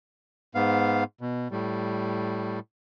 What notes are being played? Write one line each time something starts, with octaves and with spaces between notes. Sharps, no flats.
G#2 B3 F5
B2
A2 G3